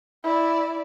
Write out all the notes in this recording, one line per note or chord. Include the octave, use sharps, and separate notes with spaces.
E4 D5